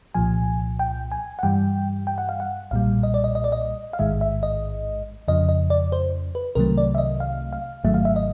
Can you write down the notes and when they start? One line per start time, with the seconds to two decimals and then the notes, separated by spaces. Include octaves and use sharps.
0.14 C2 A#2 F3 G#5
0.79 G5
1.12 G#5
1.39 F#5
1.43 G2 E3 G3 G5
2.07 G5
2.18 F#5
2.29 F5
2.40 F#5
2.71 B1 A#2 G3 F5
3.03 D#5
3.14 D5
3.24 D#5
3.35 D#5
3.44 D5
3.52 D#5
3.93 F5
3.99 A1 G#2 D#3 G#3 E5
4.21 E5
4.43 D#5
5.28 F2 C#3 F3 D#5
5.49 D#5
5.70 D5
5.92 C5
6.35 B4
6.55 C2 C3 D#3 F#3 A3 A#4
6.78 D5
6.95 E5
6.98 D#5
7.20 F5
7.53 F5
7.84 G#1 G#2 D#3 F#3 A3 E5
7.94 F5
8.05 E5
8.16 D#5